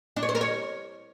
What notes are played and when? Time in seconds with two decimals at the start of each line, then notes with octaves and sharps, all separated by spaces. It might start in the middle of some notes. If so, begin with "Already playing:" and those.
0.16 D4
0.23 C#5
0.29 C5
0.35 A#4
0.41 C#5